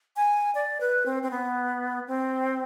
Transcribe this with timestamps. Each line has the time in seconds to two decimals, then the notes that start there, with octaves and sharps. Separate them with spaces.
0.16 G#5
0.55 D5
0.81 B4
1.06 C4
1.23 C4
1.31 B3
2.08 C4